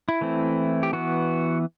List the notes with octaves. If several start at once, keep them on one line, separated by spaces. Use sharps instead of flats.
E4
E3 A3 C4
G4
E3 B3 F#4